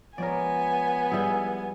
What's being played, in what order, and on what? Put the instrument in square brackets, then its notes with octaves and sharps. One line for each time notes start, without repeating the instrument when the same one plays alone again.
[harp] F3 G#3 C#5 [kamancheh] B3 G#5 [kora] A#4 D5
[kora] G3 E4 G#4